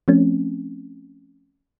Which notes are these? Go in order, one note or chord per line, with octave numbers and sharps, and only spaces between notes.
F3 A3 C4 C#4